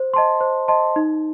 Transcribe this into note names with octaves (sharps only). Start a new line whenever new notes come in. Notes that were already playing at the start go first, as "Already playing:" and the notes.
Already playing: C5
D#5 A5 C6
C5
D#5 A5 C6
D#4